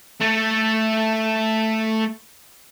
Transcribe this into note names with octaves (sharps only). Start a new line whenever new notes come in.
A3 A4